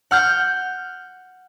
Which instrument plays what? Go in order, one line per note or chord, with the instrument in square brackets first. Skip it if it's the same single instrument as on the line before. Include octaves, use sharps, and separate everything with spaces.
[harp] F#5 F6 G6